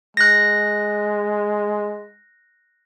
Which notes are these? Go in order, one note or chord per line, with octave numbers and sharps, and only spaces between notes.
G#3 F#6 A#6